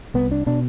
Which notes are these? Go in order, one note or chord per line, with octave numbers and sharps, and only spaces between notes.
C2 B3
D4
B2 D4